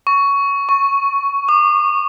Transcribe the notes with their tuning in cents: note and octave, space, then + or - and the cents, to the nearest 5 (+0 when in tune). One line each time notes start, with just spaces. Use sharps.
C#6 +10
C#6 -5
D6 +45